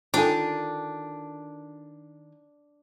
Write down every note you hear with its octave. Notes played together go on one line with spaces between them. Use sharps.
D#3 D4 F4 A4 G#5